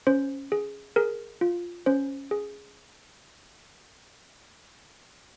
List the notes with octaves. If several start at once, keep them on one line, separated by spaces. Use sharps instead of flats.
C#4 C5
G#4
G#4 A#4
F4
C#4 C5
G#4